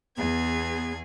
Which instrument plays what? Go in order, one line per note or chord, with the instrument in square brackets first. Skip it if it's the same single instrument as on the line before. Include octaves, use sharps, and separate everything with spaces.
[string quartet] E2 G#4 G#6 [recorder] B3